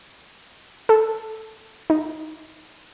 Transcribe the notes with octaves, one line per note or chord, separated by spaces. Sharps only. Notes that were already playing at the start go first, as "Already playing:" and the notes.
A4
D#4